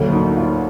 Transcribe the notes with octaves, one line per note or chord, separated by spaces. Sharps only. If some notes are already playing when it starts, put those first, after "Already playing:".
Already playing: D2 D3 F#3 A#3
D#4
F4